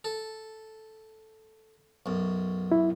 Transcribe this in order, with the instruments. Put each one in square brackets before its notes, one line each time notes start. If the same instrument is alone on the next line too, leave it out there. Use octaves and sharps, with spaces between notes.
[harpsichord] A4
B1 F#2
[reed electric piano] E4